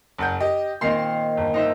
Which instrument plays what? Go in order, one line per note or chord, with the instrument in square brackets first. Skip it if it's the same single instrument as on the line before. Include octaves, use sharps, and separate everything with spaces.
[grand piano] F#1 F#5 G6
G4 D#5
[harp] A#2 D#3 C4 [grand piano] C6 C7
[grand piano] G1
[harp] D#4 C5 E5